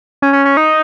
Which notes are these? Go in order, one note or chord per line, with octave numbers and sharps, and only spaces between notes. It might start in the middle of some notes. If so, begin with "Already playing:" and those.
C#4
C#4
C#4
D#4